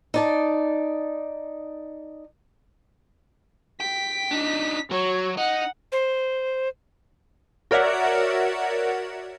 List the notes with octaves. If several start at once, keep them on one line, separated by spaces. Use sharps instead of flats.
D#4 D5 A5
G5 B6
D4 D#4
F#3 C#5
D#4 F#5
C5
F#4 A#4 C#5 D5 E5 F#5